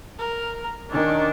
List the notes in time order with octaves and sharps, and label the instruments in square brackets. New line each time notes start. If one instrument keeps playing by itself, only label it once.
[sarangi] A#4
[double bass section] D#3 [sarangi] C#4 [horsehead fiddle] D4